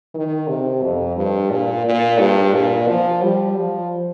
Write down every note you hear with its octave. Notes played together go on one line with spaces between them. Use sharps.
D#3
C3
F2
G2
A#2
A#2
G2
A#2
F3
G3
F3